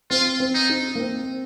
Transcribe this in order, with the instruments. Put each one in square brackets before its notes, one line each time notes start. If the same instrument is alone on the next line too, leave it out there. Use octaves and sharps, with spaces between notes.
[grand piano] C4 [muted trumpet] F4
[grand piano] C4
[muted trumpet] D#4
[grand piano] D#4
A#3
C4